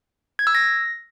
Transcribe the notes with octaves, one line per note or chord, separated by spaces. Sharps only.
G#6
E6
A#6